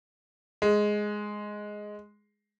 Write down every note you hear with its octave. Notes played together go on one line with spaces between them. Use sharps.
G#3